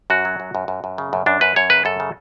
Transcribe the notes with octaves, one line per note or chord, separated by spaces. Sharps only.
F#2 F#4
F#3
F#2
F#2
F#2
F#2
C#3
F#2
F#2 D4
F#2 B4
F#2 C#5
C#3 B4
F#2 A4
C#3